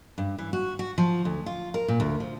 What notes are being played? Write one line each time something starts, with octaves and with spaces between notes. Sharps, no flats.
G2
E3
F#4
F#4
F3
D2
F4
A#4
A#2
D2
F3